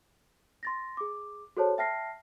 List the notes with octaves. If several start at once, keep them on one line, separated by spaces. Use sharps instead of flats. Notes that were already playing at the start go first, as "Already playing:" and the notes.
C6 A6 A#6
G#4 D6
F#4 G#4 A4 C5 C#5 A5
E5 G5 A5 F6 A#6 C7